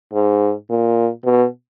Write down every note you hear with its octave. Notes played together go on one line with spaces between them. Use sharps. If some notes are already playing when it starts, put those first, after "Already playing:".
G#2
A#2
B2